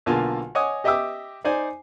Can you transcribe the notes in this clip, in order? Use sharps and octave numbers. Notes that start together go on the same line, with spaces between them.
B1 D3 A#3 F4 G#5 A5
C#5 D#5 F#5 G#5 D6 D#6
G4 D#5 E5 G5 D6 E6
D#4 C5 D5 G#5